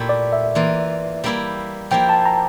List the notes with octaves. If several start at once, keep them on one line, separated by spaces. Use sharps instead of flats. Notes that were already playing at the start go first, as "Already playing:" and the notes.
Already playing: A#2 A3 E4 G4
D5
E5
E3 A#3 F4
G3 A#3 E4 G4
F3 A#3 E4 G4 G5
A5
A#5